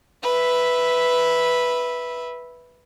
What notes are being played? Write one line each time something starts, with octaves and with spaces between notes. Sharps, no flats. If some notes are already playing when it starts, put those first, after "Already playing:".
B4 E5